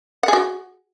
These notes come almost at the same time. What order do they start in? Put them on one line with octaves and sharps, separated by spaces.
F#5 G#4 F#4